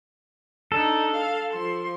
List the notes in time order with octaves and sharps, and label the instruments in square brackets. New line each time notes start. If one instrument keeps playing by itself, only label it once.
[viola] D4 D#4 [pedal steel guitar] A4
[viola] F5
F3 C6